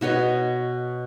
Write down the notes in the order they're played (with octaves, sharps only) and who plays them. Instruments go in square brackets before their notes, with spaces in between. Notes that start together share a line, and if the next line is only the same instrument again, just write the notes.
[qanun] B2 F#4 C#5 D#5